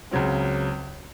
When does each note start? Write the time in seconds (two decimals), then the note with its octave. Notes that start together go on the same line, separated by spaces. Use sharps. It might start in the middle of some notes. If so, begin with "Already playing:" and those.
0.11 C#2 C#3 F#3 C4